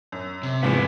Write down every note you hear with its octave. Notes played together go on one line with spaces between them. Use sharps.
F#2
C3
E2 G#2 F3 B3